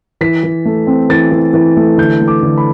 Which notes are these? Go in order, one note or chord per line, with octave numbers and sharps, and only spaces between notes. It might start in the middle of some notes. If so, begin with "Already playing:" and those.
E3 B6
E3
A3
C4
E3 A6
E3
E3
A3
D3 G6
A3
D6
D3
B5